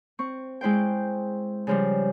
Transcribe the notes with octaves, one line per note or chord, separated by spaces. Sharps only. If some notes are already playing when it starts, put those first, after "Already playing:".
C4 C#6
G#3 E4 C5 G5
C#3 F3 G3